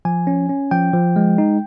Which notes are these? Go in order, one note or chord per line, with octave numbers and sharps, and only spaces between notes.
F3 G#5
C#4
C#4
F3 G5
F3
G#3
D#4